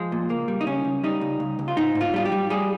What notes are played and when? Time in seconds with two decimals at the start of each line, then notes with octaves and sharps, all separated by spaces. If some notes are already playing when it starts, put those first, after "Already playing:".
Already playing: F3 G#3
0.12 A#2
0.29 C#2 A#3
0.48 G3
0.61 D#4
0.66 C#2 C#4
0.85 C#2
1.04 G3 D#4
1.21 C#2
1.40 C#2
1.59 C#2
1.68 F4
1.77 G#2 D#4
1.95 G#2
2.01 F4
2.14 G3 F4
2.25 G4
2.32 G3
2.50 G3 G#4